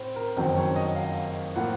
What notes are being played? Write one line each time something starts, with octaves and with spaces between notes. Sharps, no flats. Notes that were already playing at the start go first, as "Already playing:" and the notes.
Already playing: A2 C4 C5
A#4
F#1 F2 D#3 F#3 C5
C#5
D#5
F5
A2 F3 A#3 F#5